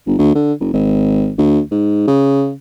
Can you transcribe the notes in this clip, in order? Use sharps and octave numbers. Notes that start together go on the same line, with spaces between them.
G1
D2
D3
F#1
G#1
D2
G#2
C#3